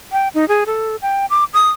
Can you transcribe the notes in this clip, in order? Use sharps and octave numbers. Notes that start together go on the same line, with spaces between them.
G5
D#4
G#4
A4
G5
D6
D#6